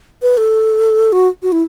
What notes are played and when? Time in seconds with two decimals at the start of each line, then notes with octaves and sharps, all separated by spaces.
0.22 B4
0.37 A4
1.12 F#4
1.43 F#4
1.52 E4